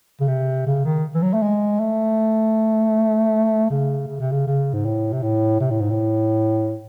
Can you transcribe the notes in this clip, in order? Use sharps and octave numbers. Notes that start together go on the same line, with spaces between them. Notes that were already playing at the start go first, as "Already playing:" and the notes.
C#3
C3
C#3
D#3
E3
F#3
A3
G#3
A3
C#3
C#3
C3
C#3
C#3
G#2
A2
C3
A2
C3
A2
G#2
A2